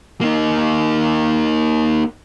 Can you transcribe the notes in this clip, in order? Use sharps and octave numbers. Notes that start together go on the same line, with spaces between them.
A#3 D#4